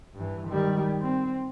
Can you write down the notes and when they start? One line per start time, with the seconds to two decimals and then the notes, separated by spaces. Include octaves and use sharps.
0.15 G2 E3
0.48 D#3 G3
1.02 C4